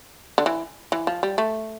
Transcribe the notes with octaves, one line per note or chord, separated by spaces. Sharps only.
D3
E3
E3
F3
G3
A3